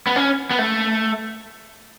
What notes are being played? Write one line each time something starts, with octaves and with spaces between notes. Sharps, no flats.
B3
C#4
B3
A3